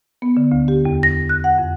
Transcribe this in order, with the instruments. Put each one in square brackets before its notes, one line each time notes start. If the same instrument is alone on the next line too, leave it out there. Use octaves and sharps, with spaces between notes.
[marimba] B3
D3
D2
G4
E2
A#6
F#6
F#5
F2